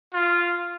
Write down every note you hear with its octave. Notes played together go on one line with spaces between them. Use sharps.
F4